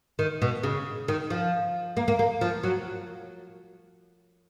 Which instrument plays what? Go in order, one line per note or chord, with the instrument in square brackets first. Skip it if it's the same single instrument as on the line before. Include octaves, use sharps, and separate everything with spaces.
[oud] D#3
B2
C#3
D#3
F3
A#3
A#3
A#3
F3
F#3